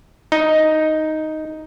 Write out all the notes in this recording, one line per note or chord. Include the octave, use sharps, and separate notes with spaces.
D#4